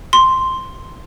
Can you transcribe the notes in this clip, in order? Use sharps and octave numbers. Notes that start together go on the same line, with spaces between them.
C6